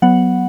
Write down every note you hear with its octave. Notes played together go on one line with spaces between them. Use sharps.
F#3 B3 F#5